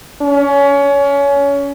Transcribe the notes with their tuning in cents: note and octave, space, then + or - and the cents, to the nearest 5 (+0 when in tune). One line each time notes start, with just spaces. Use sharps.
C#4 +25